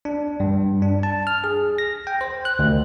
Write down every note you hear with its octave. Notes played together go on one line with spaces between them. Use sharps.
D4
G2
D4
A5
F6
G#4
A#6
G5
C5
F#6
D2